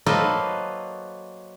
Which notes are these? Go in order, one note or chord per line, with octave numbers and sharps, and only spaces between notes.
F#3 A#3 A4 B4 C5 D#5